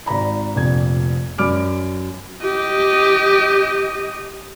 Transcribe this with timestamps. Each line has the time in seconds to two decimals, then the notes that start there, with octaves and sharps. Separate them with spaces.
0.06 G#1 D5 A#5 B5
0.54 F1 A#1 F2 G#6
1.38 F#2 D5 B5 D6 F6 D7
2.42 G4 D#5